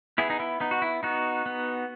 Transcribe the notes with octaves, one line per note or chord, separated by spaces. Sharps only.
B3 E4 G#4
D#4
E4
B3 D#4
F#4
E4
B3 D#4 F#4
B3